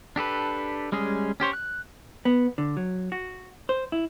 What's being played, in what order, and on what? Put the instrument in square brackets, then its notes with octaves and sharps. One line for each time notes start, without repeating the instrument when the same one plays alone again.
[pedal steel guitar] D4 G4 A4 B4
G3 G#3 C#4 G#4
C#4 G4 C5 C#5
F#6
[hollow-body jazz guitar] B3
D3
F#3
F#4
C5
E4